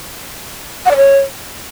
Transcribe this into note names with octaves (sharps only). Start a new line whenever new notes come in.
F#5
D5
C#5